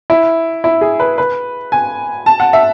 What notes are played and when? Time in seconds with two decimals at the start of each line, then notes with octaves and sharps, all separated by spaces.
0.10 E4
0.64 E4
0.81 G#4
1.00 B4
1.18 B4
1.72 G#5
2.26 A5
2.40 F#5
2.53 E5